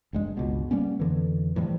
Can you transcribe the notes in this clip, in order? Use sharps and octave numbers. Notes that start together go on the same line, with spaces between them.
G1 G2 G#3
G1 C#2 B2
G3 A#3 B3 C#4
F2 D3 E3
A2 E3 F3 G3